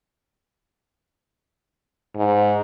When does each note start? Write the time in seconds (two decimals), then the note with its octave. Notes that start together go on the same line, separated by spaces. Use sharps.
2.15 G#2